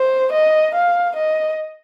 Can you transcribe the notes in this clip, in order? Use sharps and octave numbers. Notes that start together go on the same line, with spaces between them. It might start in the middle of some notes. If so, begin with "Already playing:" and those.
Already playing: C5
D#5
F5
D#5